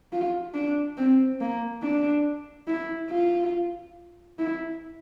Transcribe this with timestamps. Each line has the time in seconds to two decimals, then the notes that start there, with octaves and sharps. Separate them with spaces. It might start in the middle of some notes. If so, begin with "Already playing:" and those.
0.13 F4
0.54 D4
0.98 C4
1.41 A#3
1.82 D4
2.68 E4
3.10 F4
4.39 E4